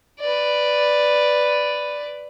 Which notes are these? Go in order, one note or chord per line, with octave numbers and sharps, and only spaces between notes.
B4 D5